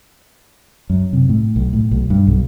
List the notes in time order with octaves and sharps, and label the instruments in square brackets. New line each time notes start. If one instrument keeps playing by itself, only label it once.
[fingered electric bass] F#2
C3
A2
B1
A2
B1
G2
B1